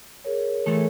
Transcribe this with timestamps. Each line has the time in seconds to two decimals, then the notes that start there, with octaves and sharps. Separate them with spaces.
0.25 G#4 A#4 C#5
0.66 E3 A3 A4